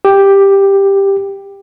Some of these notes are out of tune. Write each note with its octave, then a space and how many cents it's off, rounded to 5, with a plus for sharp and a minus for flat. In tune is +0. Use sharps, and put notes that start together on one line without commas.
G4 +5